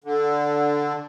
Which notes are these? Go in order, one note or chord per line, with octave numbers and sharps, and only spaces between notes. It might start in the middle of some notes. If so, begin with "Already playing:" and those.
D3